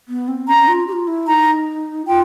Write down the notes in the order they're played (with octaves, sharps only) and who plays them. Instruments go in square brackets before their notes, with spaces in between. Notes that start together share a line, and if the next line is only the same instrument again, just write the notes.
[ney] B3
C4
[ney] C#4 [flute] A#5
[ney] F4
G4
F4
E4
[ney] D#4 [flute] A#5
[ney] F4 [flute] G5